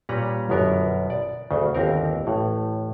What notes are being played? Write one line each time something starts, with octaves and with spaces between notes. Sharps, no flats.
A#2 G3 C#4 B4 A#5
G1 F#2 B2 B3 A#4
D5
D2 C#3
G1 D#2 C4 A#4
A1 A2